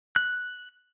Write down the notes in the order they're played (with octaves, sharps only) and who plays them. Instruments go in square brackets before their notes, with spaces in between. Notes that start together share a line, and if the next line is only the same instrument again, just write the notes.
[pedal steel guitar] F#6